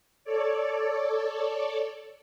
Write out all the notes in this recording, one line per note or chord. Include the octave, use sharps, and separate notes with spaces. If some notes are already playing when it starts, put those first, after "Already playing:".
A4 C#5 D5